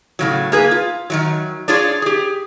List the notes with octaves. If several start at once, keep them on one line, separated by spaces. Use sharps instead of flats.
A2 C#3 F#3
A#3 G#4 B4
F4
D#3 E3 F#3
D4 F4 G#4 C#5 D5
G4 G#4